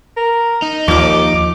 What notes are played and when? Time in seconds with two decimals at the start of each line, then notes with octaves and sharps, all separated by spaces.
0.17 A#4
0.62 D#4
0.88 D#2 F3 D5 D6